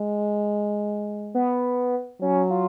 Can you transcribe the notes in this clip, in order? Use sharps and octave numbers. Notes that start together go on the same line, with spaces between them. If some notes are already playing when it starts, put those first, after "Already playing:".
Already playing: G#3
B3
F#3 C#4
F4